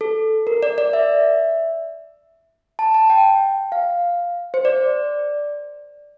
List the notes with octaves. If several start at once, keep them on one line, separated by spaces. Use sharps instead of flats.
A4
A#4
D5
D5
E5
A5
A5
G5
F5
C5
D5